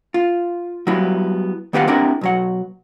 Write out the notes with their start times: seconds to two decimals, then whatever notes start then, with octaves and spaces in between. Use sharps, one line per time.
0.14 F4
0.87 F#3 G3 B3 E4
1.73 D#3 B3 G4 B4 F5 F#5
1.87 C4 D4 E4 G4 A#4 F#5
2.21 B1 F#3 F#5